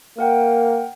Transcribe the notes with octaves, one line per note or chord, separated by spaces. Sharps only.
A#3 A#4 F#5 G5